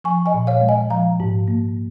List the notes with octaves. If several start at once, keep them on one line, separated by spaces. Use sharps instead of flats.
F3 G#5 C#6
D#5 G#5
A#2
C#5 F5
G#3
D#5 G#5
F3 F5 A#5
G#2
A#3